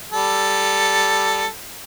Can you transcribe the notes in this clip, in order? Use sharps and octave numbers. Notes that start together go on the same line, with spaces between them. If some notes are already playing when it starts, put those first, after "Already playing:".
G3 A4